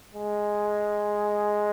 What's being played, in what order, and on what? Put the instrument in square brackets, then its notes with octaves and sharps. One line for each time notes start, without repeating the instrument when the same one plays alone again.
[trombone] G#3